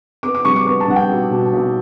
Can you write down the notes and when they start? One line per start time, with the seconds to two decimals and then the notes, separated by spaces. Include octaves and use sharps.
0.23 B3 D6
0.35 D6
0.45 G3 C#6
0.56 D6
0.66 B3 C#6
0.80 A5
0.88 G3 F#5
0.96 G5
1.10 B1
1.31 B2
1.53 B1